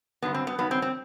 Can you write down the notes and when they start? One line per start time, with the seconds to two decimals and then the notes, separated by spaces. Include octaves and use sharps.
0.22 G2 D3 F#3 B3
0.34 C4
0.47 B3
0.58 G2 D#3 F#3 B3
0.71 C4
0.82 C4